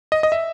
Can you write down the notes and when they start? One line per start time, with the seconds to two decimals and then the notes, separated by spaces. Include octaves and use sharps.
0.12 D#5
0.23 D#5
0.32 E5